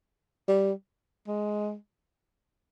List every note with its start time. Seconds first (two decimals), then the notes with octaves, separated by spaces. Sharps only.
0.48 G3
1.28 G#3